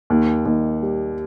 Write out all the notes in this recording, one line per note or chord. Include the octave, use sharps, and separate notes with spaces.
D#2
D#2
G3